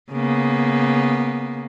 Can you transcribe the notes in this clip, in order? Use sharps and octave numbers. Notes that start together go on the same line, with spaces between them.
C#3 A#3 B3